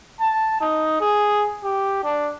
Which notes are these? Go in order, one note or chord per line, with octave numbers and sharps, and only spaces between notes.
A5
D#4
G#4
G4
D4